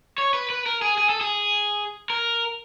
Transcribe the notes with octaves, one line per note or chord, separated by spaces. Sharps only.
C#5
B4
B4
A#4
G#4
G#4
A4
G#4
A#4